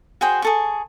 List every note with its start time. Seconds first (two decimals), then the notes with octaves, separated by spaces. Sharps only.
0.21 F#4 G#4 C5 G5
0.42 G#4 A4 C#6